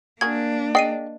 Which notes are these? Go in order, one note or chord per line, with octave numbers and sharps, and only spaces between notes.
A#3 D4 F#4 G#4 A#4 G#6
G#4 D5 D#5 G5 C7 D#7